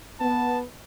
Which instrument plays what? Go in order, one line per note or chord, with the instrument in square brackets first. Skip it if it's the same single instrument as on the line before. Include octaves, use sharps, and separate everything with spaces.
[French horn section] B3 [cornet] A5